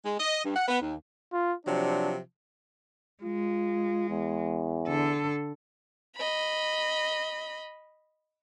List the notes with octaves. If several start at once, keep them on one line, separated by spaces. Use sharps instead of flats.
G#3
D#5
G2
F#5
B3
D#2
F4
C3 F3 F#3 D4
G#3 F4
E2
D3 A4
D#5 B5